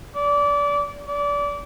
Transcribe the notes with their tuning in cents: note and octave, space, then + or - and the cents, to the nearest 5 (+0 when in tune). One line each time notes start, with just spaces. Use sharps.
D5 -25
D5 -25